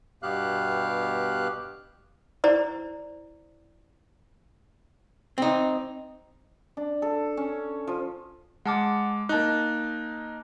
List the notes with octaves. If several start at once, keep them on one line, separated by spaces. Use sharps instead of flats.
G2 B2 B3 G4 F5 F#6
E4 C5 D5 A#5
C4 D#4
D4
A4
C#4
F3
G#3 F#5 A5 D6 F6
A#3 D#4 A5 F#6